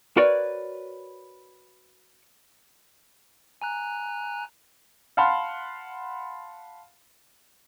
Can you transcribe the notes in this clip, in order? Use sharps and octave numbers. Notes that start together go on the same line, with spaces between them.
F#4 A#4 B4 C#5 D5
G#5 A#5 F#6
F5 F#5 A5 B5 C6 F6